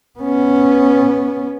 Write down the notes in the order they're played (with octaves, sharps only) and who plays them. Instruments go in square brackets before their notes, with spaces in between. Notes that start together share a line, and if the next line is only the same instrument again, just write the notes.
[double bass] B3 C#4